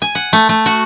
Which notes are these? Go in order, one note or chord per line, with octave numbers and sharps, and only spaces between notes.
G#5
F#5
A3
A3
F#4